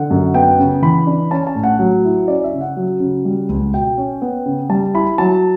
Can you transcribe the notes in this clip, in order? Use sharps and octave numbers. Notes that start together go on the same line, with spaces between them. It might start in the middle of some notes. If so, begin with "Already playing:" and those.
Already playing: D3 F#5
F#2
B3 G5
C#3
E3 B5
D4
C#4 A5
A5
A2
F#5
F#3
E4
C#4 D5
E5
C#3
F#5
F#3
C#3
G3
C#2
B2 G5
C#4
B3
C#3
G3 A5
E4 B5
F#3 A5